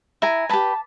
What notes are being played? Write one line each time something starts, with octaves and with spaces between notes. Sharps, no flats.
E4 G#5 A#5
G4 B4 A5 B5